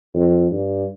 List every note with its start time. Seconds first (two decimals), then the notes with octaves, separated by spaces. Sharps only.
0.14 F2
0.51 G2